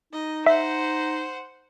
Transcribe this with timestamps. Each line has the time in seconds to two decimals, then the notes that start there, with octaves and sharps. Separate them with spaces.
0.13 D#4 D#5
0.46 C5 E5 F#5